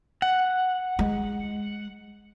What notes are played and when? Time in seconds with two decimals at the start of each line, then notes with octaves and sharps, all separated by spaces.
0.22 F#5
0.99 G#3